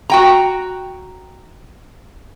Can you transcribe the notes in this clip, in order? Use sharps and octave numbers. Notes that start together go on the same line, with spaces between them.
F#4 G5 A#5